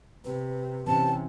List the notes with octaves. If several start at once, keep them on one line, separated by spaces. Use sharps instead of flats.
C3 B4
C3 E3 C4 C#4 A5